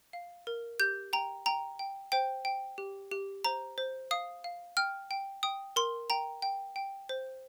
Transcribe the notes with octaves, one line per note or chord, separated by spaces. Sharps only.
F5
A#4
G4 G6
G5 A#5
G5 A#5
G5
C5 G5
G5
G4
G4
C5 A#5
C5
F5 D#6
F5
G5 F6
G5
G5 D#6
A#4 C6
G5 A#5
G5
G5
C5